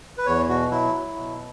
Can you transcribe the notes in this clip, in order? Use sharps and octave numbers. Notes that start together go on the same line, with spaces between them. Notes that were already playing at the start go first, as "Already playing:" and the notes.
B4
E2 C#5
B2 F#4
F#3 E4
F#3
B2